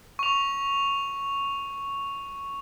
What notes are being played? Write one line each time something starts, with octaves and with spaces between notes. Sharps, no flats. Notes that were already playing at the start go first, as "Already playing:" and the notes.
C#6 F7